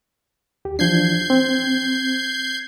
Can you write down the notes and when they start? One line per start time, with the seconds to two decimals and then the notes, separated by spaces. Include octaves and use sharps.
0.65 D#2 G4
0.79 E3 F3 D4 G6 G#6 C7
1.30 C4